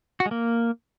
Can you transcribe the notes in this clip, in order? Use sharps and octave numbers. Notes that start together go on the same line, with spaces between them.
F#4
G#3
A#3